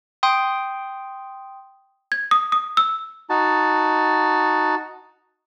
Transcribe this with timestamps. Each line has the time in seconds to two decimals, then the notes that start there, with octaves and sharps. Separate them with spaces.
0.23 G5 C6 D#6
2.12 G#6
2.31 D#6
2.52 D#6
2.77 E6
3.30 D#4 F#4 A5